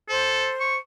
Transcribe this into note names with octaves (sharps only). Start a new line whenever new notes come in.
A4 C5
C#6